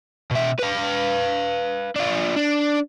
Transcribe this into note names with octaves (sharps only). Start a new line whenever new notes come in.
B2 E5
B4 F5
D4 F4
D4